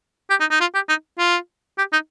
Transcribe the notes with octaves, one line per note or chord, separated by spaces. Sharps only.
G4
D#4
D#4
F4
G4
D#4
F4
G4
D#4